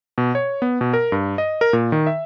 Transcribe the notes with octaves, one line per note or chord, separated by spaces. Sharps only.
B2
C#5
B3
B2
A#4
G2
D#5
A#4
A#2
D#3
E5